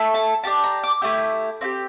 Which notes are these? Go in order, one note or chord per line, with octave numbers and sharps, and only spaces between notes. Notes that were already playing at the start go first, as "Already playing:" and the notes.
Already playing: A3 E4 A4
A5
D4 G4 A5
A#5
D6
A3 E4 G4
C4 E4 G4